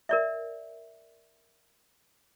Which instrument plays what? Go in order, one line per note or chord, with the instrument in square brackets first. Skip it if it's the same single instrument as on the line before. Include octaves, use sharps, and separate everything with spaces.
[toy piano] A#4 D5 E5